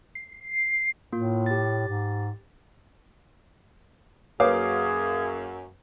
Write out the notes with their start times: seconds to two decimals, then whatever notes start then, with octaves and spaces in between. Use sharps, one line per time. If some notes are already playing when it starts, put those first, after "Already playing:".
0.15 C7
1.13 A2 A#3 F4
1.46 G4 A6
1.88 G#2
4.40 F#2 A#3 G#4 B4 C#5 F5 D6 D#6